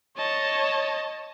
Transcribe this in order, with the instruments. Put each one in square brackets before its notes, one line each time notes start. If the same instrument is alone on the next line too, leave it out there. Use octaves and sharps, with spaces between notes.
[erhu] C#5 [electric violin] D#5 A5